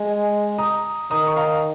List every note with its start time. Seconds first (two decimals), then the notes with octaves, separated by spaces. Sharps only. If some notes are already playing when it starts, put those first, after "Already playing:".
Already playing: G#3 G#5
0.58 A#5 D#6
1.11 D#3 A#5 D#6
1.27 C#6
1.37 F5 A#5